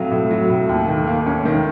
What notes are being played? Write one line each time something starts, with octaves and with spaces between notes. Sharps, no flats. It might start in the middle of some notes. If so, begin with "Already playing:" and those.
Already playing: A2 F#3 C4 F5
A2
F#3
A2
D#2
D#3
A#3
C#4
D#3